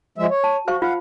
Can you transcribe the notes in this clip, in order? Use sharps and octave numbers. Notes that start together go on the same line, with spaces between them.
F3 G#3 E5
C#5
A5
F#4 C5 F5 C#6
F4 F5 F#5